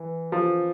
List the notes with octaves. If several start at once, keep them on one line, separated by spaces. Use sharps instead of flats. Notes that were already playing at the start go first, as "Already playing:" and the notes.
Already playing: E3
F3